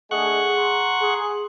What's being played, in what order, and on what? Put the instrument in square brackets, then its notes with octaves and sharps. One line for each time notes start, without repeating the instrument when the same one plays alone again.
[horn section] A3 D4 D#5 [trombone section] G#4 [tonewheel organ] F#5 C#6 F#6
[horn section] A#5 C6
[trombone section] G#4